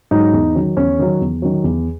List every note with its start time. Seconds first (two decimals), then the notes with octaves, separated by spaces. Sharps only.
0.11 G#2 F#3 D#4
0.33 E2
0.55 D#3 F#3
0.77 E2 C#4
0.99 D#3 F#3
1.21 E2
1.42 D#3 F#3
1.64 E2